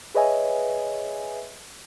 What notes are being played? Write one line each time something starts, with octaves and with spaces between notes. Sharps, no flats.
G#4 B4 C#5 D#5 E5 G#5